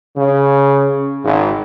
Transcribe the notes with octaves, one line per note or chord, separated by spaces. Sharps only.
C#3
G#1